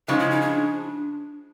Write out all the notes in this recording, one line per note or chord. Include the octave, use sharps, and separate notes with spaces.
C#3 F3 G#3 D#4
E4
D#4
D4